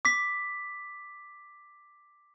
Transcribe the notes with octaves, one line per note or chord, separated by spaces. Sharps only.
D6 B6